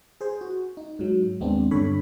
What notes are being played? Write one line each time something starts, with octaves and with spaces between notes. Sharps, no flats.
G#4 C5
F#4
D#4
G#2 F#3
D#2 G#3 B3 C4 D4
G2 D3 A4 C#5 B5